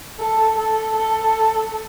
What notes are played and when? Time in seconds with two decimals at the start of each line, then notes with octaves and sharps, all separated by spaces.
0.19 A4
0.57 A4
0.95 A4